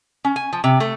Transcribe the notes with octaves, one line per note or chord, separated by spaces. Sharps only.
C#4
G#5
F3
C3
A3